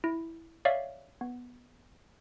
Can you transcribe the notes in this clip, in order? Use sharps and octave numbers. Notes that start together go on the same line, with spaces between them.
E4
C#5 D5 E5 F5
B3